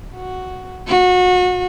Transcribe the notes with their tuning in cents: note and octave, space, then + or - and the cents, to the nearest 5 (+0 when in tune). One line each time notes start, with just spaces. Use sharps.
F#4 +0
F#4 -30